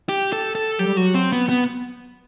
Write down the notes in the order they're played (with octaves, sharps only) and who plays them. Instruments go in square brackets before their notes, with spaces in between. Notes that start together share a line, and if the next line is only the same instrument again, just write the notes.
[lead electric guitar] G4
A4
A4
[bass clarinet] F#3 [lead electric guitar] G4
[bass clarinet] G3
[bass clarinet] F#3 [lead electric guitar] F#4
[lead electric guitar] C4
B3
B3